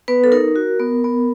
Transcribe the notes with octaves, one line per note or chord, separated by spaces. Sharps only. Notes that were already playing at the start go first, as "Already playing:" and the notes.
B3 B4
A4
D#4 A#4
F#4
B3
B3